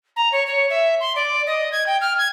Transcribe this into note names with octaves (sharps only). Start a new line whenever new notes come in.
A#5
C#5
C#5
E5
C6
D5
D#5
G#6
G5
F6
G#6